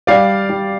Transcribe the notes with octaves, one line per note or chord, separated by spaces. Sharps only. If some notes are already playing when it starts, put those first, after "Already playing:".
G3 D5 F5
G3